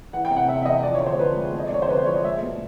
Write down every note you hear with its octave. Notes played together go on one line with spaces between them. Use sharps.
E3 F#5
G5
C3
F#5
C3 E5
E5
E2 D#5
F3 D5
C#5
D3
C5
F3 B4
G#3
F2 D#5
D5
D3 C#5
C5
F2 B4
C5
F3 C#5
D#5
G#3 E5
B2